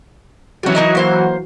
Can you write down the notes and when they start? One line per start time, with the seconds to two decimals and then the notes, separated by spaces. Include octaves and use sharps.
0.63 E3 F#3 G3 C#4 F#4
0.75 D#4 A#4 D#5
0.95 A#3 C5 F5